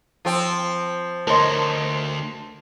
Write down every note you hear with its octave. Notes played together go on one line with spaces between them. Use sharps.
F3 C4
D2 A#4 C#5 D#5 A5 C6